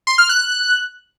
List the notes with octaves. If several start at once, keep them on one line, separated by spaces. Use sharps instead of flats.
C6
F6
F#6